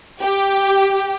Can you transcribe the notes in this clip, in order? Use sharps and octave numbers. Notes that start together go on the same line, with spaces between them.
G4